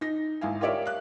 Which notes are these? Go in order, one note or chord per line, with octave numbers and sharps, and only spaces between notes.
D#4 A#6
G#1 E4 F5 G#5
F4 G4 A#4 C#5 D5 E5
F5 F#6